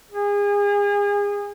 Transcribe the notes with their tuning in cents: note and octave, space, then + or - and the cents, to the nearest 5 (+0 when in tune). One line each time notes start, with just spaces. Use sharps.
G#4 -30